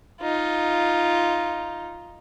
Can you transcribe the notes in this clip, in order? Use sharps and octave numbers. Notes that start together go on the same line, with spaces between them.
D#4 F4